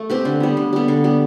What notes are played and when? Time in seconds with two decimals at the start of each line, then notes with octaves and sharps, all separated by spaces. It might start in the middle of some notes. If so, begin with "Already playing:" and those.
Already playing: A3
0.10 C4 G4 B4
0.25 D3
0.40 G3 B3
0.57 D3
0.73 G3 B3
0.88 D3
1.04 G3 B3